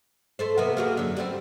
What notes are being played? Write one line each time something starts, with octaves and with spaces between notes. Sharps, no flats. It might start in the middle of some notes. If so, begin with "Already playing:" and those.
A3 A4 C5
C3 A#3 B3
A#3 F#4 G#4
F#2 D3
G3 A3 C4